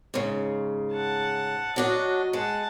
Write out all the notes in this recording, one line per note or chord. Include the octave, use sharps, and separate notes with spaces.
G#2 C#3
F#5 A5
F#3 D4 F#4 D#5
G#3 F#5 A5